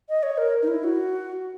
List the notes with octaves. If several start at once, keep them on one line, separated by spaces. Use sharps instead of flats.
D#5
C#5
A#4
D#4
E4
F#4